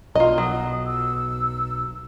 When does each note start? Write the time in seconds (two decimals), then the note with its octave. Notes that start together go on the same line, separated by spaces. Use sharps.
0.15 B1 B2 F4 D#5 A#5
0.38 F#3 D#6
0.86 E6